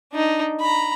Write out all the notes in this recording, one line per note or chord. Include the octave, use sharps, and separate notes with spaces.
D4 D#4
A#5 B5